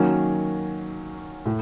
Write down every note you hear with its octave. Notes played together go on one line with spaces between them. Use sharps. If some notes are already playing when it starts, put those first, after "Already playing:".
Already playing: D#3 F#3 A#3 C#4
A2